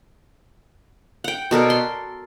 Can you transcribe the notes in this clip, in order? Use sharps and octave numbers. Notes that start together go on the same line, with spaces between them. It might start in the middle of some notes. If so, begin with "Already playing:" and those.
F#5 G5
B2 A4 A#4 D5
C6